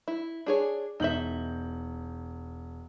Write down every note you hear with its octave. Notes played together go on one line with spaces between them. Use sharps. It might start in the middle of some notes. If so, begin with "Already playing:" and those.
E4
D4 G#4 C#5
E1 D#4 E5 G6 F#7